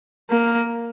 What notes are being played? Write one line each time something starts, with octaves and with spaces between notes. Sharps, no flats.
A#3